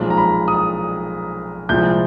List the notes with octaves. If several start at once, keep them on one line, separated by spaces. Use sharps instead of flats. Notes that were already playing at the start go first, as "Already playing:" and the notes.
Already playing: B1 A#2 F3 G#3
A#5
B5
D#6
C2 A#2 F3 G#3 G6